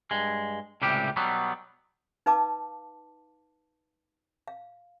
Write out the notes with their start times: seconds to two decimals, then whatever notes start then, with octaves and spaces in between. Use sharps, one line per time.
0.11 G2 G#3
0.82 C#2 A2 C3 G3 G4
1.17 B2 F#3 G3 B3
2.26 D#4 B4 F5 A5 D6
4.47 F5